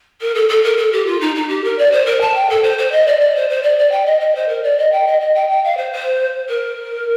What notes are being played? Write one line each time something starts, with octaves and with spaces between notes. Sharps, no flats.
A#4
A4
A4
A#4
A4
G4
F4
D#4
D#4
G4
A#4
D5
C5
A#4
A5
G5
A4
C5
C5
D#5
D5
D5
C5
C5
D5
D5
G5
D#5
D#5
C5
A#4
D5
D#5
G5
D#5
D#5
G5
G5
F5
C5
C5
A#4